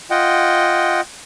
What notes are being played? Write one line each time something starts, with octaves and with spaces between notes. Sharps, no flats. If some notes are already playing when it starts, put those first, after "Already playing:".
F4 D#5 F#5 G5